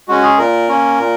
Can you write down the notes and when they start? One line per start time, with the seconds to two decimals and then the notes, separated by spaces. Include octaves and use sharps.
0.08 G#3 C#4 F#4
0.23 G#4
0.39 A#2 A#4
0.69 A#3 C#4
0.99 A#2